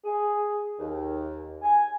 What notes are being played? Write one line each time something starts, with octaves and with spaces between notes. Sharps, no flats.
G#4
D#2
G#5